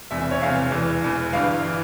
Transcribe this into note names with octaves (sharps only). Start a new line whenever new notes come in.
E1 E2 C3 E5
E5
C#5
E1 E2 C3 F5
E1 E2 E3
E1 E2 E3
G1 G2 E3 F5
E3